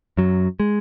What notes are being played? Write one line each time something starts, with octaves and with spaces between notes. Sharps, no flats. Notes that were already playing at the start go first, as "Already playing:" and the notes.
F#2 F#3
G#3